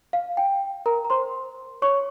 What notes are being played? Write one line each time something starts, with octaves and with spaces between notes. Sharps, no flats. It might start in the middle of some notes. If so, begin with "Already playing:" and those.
F5
G5
A#4 A#5
A#5
C5 C6
C#5 C#6